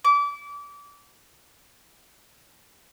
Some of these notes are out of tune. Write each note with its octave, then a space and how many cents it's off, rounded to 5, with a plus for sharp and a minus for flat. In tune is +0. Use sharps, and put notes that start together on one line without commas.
D6 -30